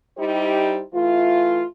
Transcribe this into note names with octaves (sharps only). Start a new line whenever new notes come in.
G3 D#4 E4 G4 C5
E3 A3 F4